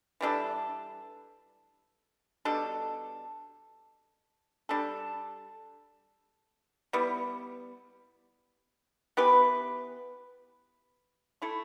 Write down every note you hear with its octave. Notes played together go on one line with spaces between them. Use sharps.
E3 G3 D4 A4
B2 G3 D4 A4
G3 D4 A4
G3 B3 E4
E3 B3 G4 B4
A3 E4 A4